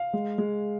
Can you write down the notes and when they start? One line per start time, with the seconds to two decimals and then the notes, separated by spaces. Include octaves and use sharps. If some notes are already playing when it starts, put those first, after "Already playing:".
Already playing: F5
0.13 G#3
0.38 G#3